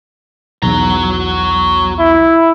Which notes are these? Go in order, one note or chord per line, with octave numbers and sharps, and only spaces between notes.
B1 E2 F#4 A#5
E4